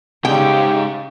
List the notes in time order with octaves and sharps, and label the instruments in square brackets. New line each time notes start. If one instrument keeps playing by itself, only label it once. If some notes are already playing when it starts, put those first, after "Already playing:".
[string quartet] C#3 [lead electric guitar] G#3 D#4 [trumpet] G4 [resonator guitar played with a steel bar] G5